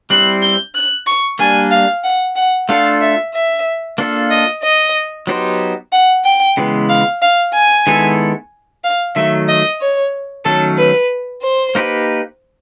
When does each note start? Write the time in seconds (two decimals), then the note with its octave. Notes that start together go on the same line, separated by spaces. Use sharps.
0.10 G3 C4 E4 F#6
0.42 G6
0.75 F#6
1.07 C#6
1.39 G3 A#3 D4 G#5
1.71 F5
2.04 F#5
2.36 F#5
2.69 A3 D4 F4 A4 F5
3.01 E5
3.34 E5
3.98 A#3 D4 F4 A4
4.31 D#5
4.63 D#5
5.27 F#3 B3 D#4 G4 C5
5.93 F#5
6.24 G5
6.57 C#3 E3 G#3 B3
6.89 F5
7.22 F5
7.54 G#5
7.87 D#3 G#3 B3 E4 A4
8.84 F5
9.16 D#3 F#3 A3 E5
9.48 D#5
9.81 C#5
10.45 D#3 F#3 A3 C#4 A4
10.78 B4
11.43 C5
11.75 A#3 D#4 G4 B4